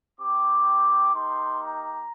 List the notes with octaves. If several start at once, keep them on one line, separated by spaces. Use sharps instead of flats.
C4 G4 D6
A#3 D#4 G4 C6
A#5